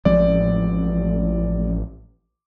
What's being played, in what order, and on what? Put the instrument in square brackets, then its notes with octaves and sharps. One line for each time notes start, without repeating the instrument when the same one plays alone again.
[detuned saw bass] A1 [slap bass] F3 G#3 C4 [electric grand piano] D5